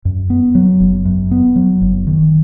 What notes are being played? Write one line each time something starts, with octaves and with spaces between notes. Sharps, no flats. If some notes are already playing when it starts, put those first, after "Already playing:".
F#2
B3
F#3
F#1
F#2
B3
F#3
F#1
D#3